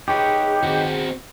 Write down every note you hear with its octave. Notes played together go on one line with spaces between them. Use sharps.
D#4 G4 G#4 B4 C#5
C4 F#4